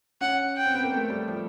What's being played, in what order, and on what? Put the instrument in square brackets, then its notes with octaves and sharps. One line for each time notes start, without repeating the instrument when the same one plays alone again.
[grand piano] C#4 [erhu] F#5
[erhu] G5
[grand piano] C4
B3
A#3
A3
G3
F3